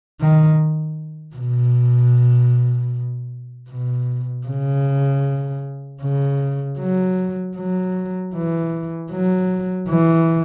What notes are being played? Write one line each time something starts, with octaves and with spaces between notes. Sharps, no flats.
D#3
B2
B2
C#3
C#3
F#3
F#3
E3
F#3
E3